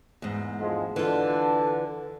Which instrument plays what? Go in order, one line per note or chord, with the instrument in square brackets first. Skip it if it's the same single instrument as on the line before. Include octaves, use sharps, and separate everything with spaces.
[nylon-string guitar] E2 G#2
[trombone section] D2 F3 G#3
[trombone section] D3 [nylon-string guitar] E3 F4